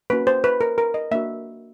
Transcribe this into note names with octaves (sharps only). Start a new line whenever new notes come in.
A#3 C#4 F#4 B4
C5
B4
A#4
A#4
D#5
A#3 D4 F#4 E5